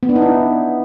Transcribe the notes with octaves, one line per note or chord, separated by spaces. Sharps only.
B3
D4
D#4
E4